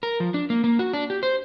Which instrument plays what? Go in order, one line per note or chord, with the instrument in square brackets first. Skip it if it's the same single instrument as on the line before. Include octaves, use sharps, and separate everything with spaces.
[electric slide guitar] A#4
F3
D4
A#3
A#3
F#4
D4
G4
C5